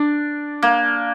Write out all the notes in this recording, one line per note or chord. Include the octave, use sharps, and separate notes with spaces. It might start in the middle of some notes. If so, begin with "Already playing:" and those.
Already playing: D4
A#3